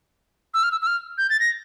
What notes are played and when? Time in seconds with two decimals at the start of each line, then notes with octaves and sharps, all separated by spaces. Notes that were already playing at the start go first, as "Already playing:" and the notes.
0.54 E6
0.63 F6
0.71 E6
0.82 E6
0.87 F6
1.18 G6
1.30 A6
1.40 A#6